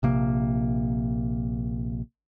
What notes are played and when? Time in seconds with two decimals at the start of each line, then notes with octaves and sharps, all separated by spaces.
0.03 A#1 C3 A#3